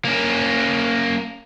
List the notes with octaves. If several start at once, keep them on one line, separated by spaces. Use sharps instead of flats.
A#3 C#4